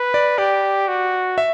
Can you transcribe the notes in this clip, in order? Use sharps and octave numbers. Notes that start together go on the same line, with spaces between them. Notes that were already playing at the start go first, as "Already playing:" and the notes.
Already playing: B4
D5
G4 D5
F#4
E5